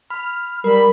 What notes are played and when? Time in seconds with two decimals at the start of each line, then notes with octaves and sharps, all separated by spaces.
0.10 B5 F6
0.64 G3 A#4 B5